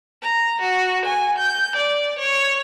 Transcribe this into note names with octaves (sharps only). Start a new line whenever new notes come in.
A#5
F#4
G#5
G6
D5
C#5